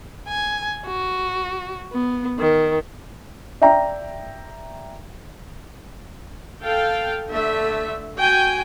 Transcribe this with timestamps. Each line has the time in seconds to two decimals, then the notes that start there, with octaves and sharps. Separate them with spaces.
0.28 G#5
0.86 F#4
1.93 B3
2.39 D#3
3.62 D5 E5 G5 A#5
6.61 A4 F5 G5
7.29 D3 A3 E5
8.16 F#4 G5 G#5